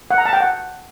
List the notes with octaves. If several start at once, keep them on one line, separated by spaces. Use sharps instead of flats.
F#5
A#5
A5
G5
F#5